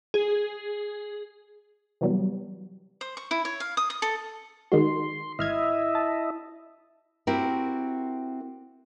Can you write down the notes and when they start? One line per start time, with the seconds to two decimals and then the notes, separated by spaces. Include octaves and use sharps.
0.14 G#4
2.01 C3 E3 F#3 G3 B3
3.01 C5
3.17 C#6
3.31 E4
3.45 C#5
3.60 F5
3.77 D#6
3.90 D#6
4.02 A4
4.72 D#3 G#3 F#4 C6
5.39 G#1 E4 D#5 E5 F6 G#6
5.95 A5
7.27 C4 E4 F#4 G4 A#4